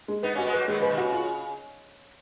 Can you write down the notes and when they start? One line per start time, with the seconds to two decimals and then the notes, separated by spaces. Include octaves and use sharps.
0.08 G#3
0.23 B3 D#4 B4
0.34 A#3 C#4 F#4
0.45 G#3 B3
0.53 F#3 A#3 B4
0.68 D#3 F#3 G#3
0.78 C#3 F3 B4
0.90 B2 D#3
0.98 C#3 F#4
1.12 F4